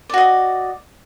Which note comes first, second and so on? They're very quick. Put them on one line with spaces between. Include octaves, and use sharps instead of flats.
D5 F#4 D#5